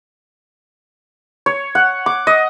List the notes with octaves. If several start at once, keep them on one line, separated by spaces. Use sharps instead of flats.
C#5
F#5
D6
D#5